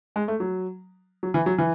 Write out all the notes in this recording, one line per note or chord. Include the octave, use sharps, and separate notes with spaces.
G#3
A3
F#3
F#3
E3
F#3
E3